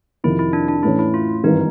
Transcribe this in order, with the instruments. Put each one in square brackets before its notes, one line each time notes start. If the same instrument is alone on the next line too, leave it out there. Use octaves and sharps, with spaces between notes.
[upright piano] F2 C3 D#3 [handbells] E4
[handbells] E4
D4
D4
[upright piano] A2 E3 A3 C#4 [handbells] E4
[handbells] E4
F4
[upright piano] G#1 G2 E3 [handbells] D#4